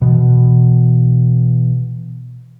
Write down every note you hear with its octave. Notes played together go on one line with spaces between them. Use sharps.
B2 E3